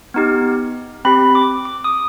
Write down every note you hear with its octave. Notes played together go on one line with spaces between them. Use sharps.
B3 D#4 G4
C4 G4 B5
D6
D6
D#6